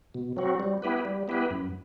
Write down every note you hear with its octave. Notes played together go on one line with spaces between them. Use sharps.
B2
F#3 C4 F#4
G3
B3 E4 G4 B4
G3
B3 E4 G4 B4
F#2